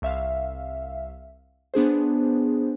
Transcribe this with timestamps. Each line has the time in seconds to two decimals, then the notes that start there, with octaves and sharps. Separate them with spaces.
0.02 C2 E5 F5
1.74 B3 D4 G#4 C5